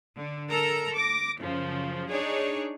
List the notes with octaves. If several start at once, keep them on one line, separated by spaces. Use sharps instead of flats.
D3
A4 A#4 A#5
D6 A#6
F#2 C#3 F3
D4 D#4 G#4 C#5